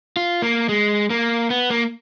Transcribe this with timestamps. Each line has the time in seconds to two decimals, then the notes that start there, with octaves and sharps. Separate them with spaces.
0.17 F4
0.42 A#3
0.69 G#3
1.10 A#3
1.50 B3
1.70 A#3